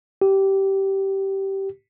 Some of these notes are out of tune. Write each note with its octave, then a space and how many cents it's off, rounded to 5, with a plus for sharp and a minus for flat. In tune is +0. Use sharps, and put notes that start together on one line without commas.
G4 -15